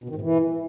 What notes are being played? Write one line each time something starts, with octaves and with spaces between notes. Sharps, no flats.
B2
D#3
G#2
E3